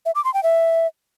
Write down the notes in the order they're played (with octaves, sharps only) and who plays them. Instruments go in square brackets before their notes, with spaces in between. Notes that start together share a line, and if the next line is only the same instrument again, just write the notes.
[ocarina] E5
D6
C6
G5
E5